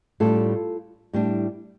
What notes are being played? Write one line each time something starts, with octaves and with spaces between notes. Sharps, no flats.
A2 G3 D4 F4 A4
A2 G3 D4